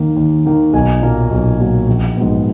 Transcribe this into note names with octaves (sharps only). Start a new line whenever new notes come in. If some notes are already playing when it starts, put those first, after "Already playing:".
Already playing: D#2 D#3 A#3
D#2
D#3 A#3
B1 G#5
A#2 F#3 A#3
B1
A#2 F#3 A#3
A#1
G#2 F#3 B3